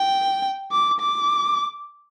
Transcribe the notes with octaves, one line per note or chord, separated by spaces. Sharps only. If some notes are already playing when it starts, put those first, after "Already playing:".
Already playing: G5
D6
D6